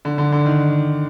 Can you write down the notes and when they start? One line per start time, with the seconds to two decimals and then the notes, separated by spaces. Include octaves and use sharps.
0.05 D3
0.18 D3
0.32 D3
0.46 D#3